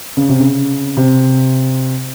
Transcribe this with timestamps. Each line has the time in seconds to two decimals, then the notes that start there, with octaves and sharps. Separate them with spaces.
0.17 C#3
0.29 C3
0.40 C#3
0.97 C3